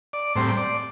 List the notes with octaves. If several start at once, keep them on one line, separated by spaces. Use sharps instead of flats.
D5
A2 G3 C4 C5
D5